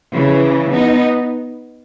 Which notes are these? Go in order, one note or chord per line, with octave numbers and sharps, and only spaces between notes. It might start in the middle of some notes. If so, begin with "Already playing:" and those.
C#3 E3
B3 D#4